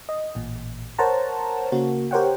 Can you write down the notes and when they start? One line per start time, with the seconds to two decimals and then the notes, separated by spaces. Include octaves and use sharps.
0.09 D#5
0.35 A1 A#2
0.98 A#4 C5 C#5 F#5 A5 A#5
1.72 C#3 A#3 F#4
2.11 G4 A#4 C5 C#5 F#5 G5